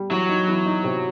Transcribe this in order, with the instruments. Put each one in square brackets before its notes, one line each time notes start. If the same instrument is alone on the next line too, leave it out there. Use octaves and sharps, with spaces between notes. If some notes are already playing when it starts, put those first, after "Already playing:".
Already playing: [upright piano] G3
[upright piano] E3 [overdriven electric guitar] F#3
[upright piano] D#4
E3
D#4
C3